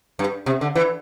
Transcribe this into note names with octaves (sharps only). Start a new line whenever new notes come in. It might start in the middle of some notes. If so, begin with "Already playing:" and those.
G2
C3
D3
E3